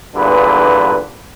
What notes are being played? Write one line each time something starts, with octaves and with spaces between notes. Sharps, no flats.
E2 G2 A#2 D3 B4